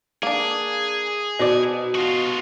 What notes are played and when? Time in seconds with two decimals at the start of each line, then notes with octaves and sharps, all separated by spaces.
0.23 A#3 D4 G#4
1.39 B2 D#4 C5 D5
1.95 F4 F#4